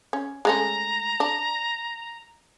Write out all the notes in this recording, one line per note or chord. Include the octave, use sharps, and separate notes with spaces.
C#4
G#3 A3 C#4 A#5
D4